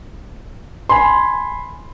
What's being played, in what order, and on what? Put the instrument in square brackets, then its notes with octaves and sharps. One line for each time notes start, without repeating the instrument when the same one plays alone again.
[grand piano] G#5 B5 C6